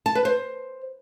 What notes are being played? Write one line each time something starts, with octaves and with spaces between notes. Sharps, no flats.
A5
B4
C5